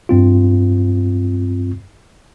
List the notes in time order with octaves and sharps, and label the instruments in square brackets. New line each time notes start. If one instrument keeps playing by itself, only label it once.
[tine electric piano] G2 C4 F4